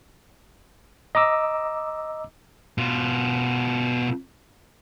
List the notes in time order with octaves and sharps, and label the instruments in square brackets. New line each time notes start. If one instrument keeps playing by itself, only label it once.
[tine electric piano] D#5 A#5 D6 E6
[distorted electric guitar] B2 F4